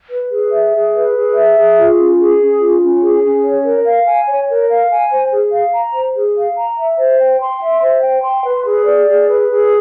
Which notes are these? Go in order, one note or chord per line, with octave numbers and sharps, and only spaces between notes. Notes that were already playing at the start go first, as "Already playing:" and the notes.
B4
G#4
E5
G#4
B4
G#4
E5
G#4
F4
C#4
G#4
C#4
F4
C#4
G#4
C#4
C#5
A#4
F5
G#5
C#5
A#4
F5
G#5
C5
G#4
F5
A#5
C5
G#4
F5
A#5
E5
C5
G5
C6
E5
C5
G5
C6
B4
G#4
D5
G#4
B4
G#4